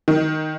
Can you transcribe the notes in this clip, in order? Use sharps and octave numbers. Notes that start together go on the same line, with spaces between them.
D#3